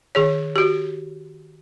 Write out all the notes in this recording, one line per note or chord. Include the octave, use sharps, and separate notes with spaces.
D#3 G#4 C#5
F#4 G4